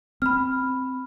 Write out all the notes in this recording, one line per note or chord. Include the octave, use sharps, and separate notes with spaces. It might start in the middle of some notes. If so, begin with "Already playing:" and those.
C4 B5 F6